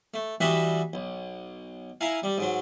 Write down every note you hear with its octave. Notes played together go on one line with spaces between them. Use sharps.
A3
E3 G3 F#4 B4 D#5 E5
B1
E4 F5 G#5 A#5
G3
G#2 F#3